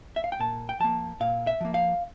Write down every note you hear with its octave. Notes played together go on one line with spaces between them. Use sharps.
E5
F5
G5
A#2 A5
G5
F3 A#3 A5
A#2 F5
E5
F3 A#3
F5